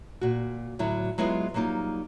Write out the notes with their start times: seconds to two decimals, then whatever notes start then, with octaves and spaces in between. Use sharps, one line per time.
0.21 A#2 F#4
0.79 D2 A2 F#3 E4
1.18 F#3 G#3 B3 E4 F4 G#4
1.54 F#3 G3 A#3 D#4 F4